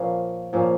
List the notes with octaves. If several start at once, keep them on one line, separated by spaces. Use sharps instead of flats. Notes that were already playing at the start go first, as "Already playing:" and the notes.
Already playing: A#2 F3 A#3 C#4
A#2 F3 A#3 C#4